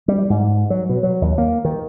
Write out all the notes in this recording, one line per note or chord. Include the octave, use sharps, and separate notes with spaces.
G3
G#2
F#3
B2
F#3
D#2
A#3
D#3